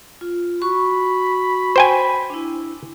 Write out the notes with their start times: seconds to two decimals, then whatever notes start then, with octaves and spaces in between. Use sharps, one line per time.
0.21 F4
0.62 F#4 B5 C#6
1.76 C5 G5 G#5
2.30 D4 E4